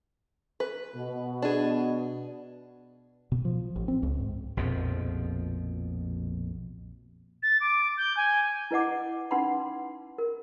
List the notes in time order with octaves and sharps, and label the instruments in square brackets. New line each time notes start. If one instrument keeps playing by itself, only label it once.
[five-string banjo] B4
[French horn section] B2
[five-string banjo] D4 G#4
[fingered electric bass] B2
F3
A1
C4
C#2
G#2
[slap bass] A#1 F2 B2 F3
[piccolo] A6
D6
G6
G#5
[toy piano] E4 B4 D#5 F#5 D6
C#4 D#4 B4 F#5 B5 C6
A#4